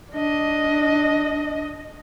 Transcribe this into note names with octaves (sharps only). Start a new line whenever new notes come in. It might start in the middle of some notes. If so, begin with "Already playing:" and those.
D4 D#5